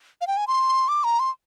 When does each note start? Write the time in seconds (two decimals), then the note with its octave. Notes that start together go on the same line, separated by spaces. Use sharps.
0.21 F5
0.27 G5
0.37 G#5
0.47 C6
0.88 D6
1.04 A#5
1.20 C6